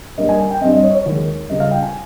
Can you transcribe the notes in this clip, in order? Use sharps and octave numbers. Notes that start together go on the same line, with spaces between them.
G2 G3 A#3 C#4 D#5
G#5
G#5
G5
G2 G3 C4 D#5
D#5
C#5
C#5
D#2 D#3 G#3
C#2 C#3 G3 D#5
F5
G5
G#5